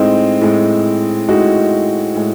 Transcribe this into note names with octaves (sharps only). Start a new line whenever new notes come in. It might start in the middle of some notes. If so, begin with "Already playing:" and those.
Already playing: A2 G#3 C4 D#4
A2 G#3
A2 G#3 D#4 F#4
A2 G#3